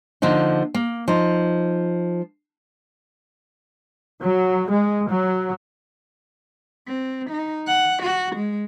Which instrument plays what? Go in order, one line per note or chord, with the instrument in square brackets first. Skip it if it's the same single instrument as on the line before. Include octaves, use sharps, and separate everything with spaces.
[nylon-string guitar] D3 F3 A#3 D#4
A#3
F3 D#4
[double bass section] F#3
G#3
F#3
[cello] C4
D#4
F#5
F#4
G#3